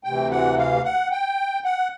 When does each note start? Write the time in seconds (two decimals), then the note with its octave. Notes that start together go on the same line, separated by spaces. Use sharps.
0.04 D2 C3 E3 G5
0.31 F#5
0.58 F5
0.84 F#5
1.11 G5
1.64 F#5